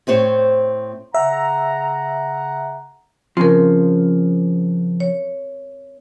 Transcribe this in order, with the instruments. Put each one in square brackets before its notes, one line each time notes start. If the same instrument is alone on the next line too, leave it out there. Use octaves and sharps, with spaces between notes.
[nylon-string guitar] A2 C4 C5 C#5
[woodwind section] C#3 F#5 A#5 [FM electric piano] E5
[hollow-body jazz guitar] C#3 F3 [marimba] C4 A#4
[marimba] C#5